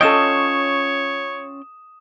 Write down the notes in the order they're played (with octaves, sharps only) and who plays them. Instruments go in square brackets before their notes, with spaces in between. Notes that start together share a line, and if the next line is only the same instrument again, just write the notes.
[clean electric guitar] C#4 F4 G5 [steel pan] A4 D#5 [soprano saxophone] C#5 [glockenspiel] D#6 E7